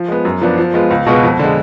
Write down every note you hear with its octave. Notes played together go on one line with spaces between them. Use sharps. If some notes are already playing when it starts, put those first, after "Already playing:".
Already playing: F3
G#3 B3
F#2
F3 B3 D4
F3
G#3 B3 F4
C#2
B2 G#3 B3 F4
F2
D3 G#3